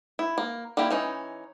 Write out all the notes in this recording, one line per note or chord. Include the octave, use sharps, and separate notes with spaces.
E4
A#3
G3 A#3 E4 G4
E3 C#4 D#4